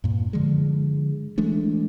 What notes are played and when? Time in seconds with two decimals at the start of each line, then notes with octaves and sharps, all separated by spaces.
0.04 G2 A#2
0.33 D3 F3 G#3
1.38 E3 G#3 A3 D4